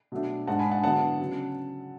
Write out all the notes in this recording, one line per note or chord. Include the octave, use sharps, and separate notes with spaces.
B2 F#3 A3 D4
G#2 G#3 D4 F#5 A5
G#5 B5
F#5 A5
D3 F#3 B3 E4 F#5 A5
C#3 F#3